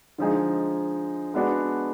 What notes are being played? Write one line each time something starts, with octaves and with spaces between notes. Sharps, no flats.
D3 F3 G#3 D#4 G#4
G#3 B3 D4 F#4